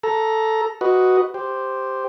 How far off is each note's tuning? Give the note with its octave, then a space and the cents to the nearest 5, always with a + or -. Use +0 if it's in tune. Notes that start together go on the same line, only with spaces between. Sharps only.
A4 +0 A#5 +10
F#4 +0 B4 +0 D#5 +0
G4 +0 C5 +0